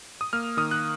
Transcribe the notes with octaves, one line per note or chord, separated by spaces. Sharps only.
D#6
A#3 F6
D#3 D#6
F#6